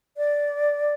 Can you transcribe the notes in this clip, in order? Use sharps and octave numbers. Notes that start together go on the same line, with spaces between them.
D5